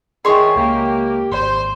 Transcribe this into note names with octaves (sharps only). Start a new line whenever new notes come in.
D#3 E4 G#4 C#5 C6
C#2 A#3 G4
G#1 C5 C6